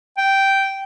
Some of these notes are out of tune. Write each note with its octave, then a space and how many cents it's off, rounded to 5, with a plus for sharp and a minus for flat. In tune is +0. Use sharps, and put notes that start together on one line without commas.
G5 -5